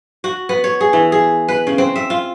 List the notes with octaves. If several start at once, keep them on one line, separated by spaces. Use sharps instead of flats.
F#4
B3
C#5
G#4
E3
G#4
B4
C#3
C4
E5
F4